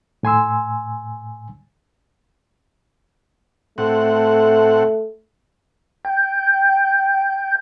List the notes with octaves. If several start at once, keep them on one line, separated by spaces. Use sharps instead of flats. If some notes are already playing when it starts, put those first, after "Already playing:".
A2 G#5 C6 E6
A2 A3 C4 F#5
G5